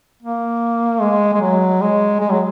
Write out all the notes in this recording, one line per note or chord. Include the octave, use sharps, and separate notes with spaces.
A#3
G#3
G#3
F#3
G#3
G#3
F#3